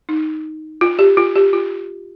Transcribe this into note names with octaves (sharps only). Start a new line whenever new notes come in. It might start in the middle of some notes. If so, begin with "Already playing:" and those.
D#4
F4
G4
F4
G4
F4